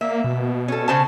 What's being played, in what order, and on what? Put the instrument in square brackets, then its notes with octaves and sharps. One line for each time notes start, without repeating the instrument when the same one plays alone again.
[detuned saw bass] A#3 [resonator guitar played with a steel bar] E5
[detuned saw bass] B2
[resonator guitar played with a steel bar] C#4 A4
C#3 C5 A5